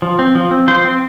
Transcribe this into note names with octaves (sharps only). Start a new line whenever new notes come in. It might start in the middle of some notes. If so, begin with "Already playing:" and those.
F3
C4
F3
C4
F3 C5
C4